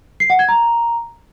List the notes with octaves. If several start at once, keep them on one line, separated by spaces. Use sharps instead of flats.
C7
F#5
G#6
A#5